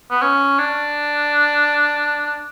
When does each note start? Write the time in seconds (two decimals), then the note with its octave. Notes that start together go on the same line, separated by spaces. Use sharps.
0.11 B3
0.22 C#4
0.59 D4